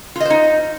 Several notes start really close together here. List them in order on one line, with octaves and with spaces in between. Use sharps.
F4 D#5 C5 D#4